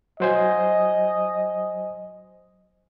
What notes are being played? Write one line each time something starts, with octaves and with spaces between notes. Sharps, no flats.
F#3 C5 D#5 G#5